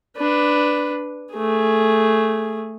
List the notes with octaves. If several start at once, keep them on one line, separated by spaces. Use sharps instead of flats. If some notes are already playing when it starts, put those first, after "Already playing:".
D4 B4
A3 G#4